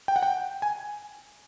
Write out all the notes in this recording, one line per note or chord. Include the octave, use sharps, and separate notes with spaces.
G5
F#5
G5
G#5